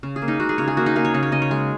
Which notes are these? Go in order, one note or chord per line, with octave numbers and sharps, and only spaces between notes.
C#3
G#4
A#3
D#4
G#3 F#4
G#4
C#3 C#5
G#4
A#3 F#4
D#4
A#3 G#4
C#5
C#3 D#4
C#5
C#3 D#5
C#5
G#3